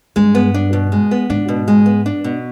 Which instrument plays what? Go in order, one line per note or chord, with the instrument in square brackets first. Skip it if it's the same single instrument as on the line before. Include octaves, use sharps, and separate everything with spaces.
[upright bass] G2 [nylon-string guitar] G#3
[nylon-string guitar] B3
D4
B2
G#3
B3
[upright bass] G#2 [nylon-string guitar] D4
[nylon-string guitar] B2
G#3
B3
D4
B2